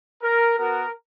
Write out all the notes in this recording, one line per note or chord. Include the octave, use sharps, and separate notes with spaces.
A#4
B3 F#4 A#4